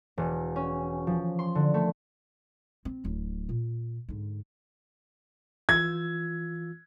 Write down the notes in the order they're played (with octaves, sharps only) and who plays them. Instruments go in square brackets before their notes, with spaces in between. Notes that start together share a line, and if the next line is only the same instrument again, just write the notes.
[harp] E1
C#4
F3
C6
D3
A3
[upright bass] C4
D1 F#3
A#2
G#2 D3
[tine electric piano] E3 F4 E6 [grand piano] G#6